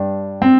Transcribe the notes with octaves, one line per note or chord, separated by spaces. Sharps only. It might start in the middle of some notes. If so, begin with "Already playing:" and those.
Already playing: G2 D4
C4